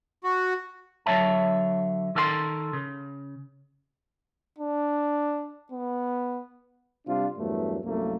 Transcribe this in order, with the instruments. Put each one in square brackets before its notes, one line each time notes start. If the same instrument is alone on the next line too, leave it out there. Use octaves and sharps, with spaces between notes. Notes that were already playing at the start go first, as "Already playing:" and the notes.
[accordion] F#4
[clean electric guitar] D3 F#3 C#5 E5 A5
D#3 A4 A#4 E5 C6
C#3
[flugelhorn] D4
B3
[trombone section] C3 G3 D4 F4
E2 G2 F#3 A3 A#3
C2 F#2 A3 A#3